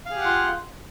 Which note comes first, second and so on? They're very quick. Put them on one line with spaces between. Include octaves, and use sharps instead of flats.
F5 G#4 G4 F#5 F4